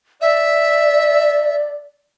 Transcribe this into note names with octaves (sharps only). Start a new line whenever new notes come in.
D5 E5